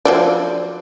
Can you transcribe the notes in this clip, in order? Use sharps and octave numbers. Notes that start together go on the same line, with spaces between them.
F3 F#3 D5